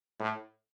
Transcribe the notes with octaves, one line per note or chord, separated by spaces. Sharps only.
A2